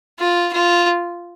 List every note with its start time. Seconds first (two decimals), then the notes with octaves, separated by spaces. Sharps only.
0.20 F4
0.53 F4